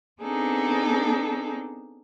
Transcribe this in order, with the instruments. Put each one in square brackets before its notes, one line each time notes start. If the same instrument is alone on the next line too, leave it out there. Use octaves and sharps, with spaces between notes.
[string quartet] B3 C4 D4 D#4 G#4 A4